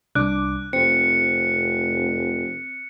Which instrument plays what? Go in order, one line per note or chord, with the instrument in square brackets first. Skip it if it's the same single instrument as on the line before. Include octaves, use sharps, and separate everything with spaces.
[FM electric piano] C2 D4 D6 [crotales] F#6
[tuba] F1 [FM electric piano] C4 [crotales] C#7